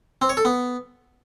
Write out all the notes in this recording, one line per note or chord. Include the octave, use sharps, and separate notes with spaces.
C4
C#5
A4
B3